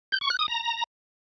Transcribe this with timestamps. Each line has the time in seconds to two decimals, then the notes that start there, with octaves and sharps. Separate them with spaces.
0.12 G6
0.21 C#6
0.30 F#6
0.39 D#6
0.48 A#5